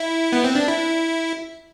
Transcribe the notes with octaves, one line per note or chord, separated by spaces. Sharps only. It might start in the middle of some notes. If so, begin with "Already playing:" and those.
Already playing: E4
B3
C4
D4
E4